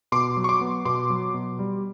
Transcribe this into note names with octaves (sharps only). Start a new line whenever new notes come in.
B2 C6 D6
F#3
C#6
C6 D6
B3
B2 C6 D6
F#3
B2
G3